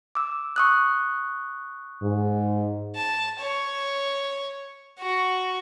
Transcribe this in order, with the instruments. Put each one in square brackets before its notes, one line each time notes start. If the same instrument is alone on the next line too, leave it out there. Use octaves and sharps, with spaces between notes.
[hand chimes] D6 E6
C#6 D#6 F#6
[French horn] G#2
[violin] A5
C#5
F#4